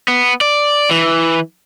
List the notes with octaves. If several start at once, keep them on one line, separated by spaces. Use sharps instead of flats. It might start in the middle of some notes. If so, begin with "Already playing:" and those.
B3
D5
E3